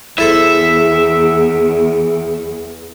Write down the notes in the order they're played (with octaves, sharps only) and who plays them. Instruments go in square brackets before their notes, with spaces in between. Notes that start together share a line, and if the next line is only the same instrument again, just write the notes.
[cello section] E2 [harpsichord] E4 A4 C5 [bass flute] G#4 [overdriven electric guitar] E5